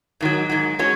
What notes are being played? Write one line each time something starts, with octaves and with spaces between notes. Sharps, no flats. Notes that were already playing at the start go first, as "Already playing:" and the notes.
G#2 D#3 F#3
G#2 D#3 F#3
G#3 C#4 F#4 C#5